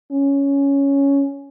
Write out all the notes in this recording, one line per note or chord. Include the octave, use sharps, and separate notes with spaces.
C#4